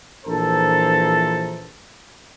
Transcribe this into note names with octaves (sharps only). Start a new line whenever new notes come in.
A#1 E3 A4 C5 A#5